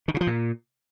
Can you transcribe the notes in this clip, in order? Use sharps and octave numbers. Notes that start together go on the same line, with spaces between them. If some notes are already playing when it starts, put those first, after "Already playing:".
D#3
C#3
F3
A#2